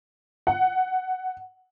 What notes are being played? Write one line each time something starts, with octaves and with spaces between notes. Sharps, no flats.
F#5